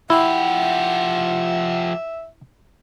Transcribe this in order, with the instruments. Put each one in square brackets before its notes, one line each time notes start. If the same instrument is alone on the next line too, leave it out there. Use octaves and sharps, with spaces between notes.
[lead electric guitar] F3 G4 [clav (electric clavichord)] E4 [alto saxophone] E5 [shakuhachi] F#5